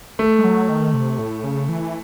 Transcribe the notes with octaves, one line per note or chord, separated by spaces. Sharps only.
A3
G#3
F#3
D#3
C3
A2
C#3
E3